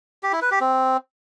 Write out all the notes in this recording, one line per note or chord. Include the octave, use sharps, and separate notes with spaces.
G4
E4
B4
G4
C4